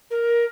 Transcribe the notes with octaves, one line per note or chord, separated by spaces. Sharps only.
A#4